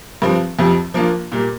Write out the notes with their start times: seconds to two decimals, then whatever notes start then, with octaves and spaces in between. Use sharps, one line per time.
0.22 G2 F3 C4
0.59 F2 C3 F3
0.94 F3 A#3 D4 F4
1.32 A#2 G3 A#3